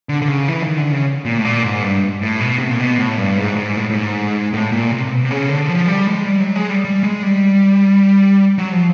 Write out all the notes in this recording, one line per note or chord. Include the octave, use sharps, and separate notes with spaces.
D3
D3
C#3
E3
D#3
D3
C#3
A#2
A2
A#2
G#2
G2
A2
B2
C3
A#2
B2
A2
G2
G#2
G#2
A2
A2
G#2
A2
A#2
C3
B2
C3
C#3
D3
F3
G3
G#3
G3
F#3
G#3
G3
G3
G#3
G3
F#3
F3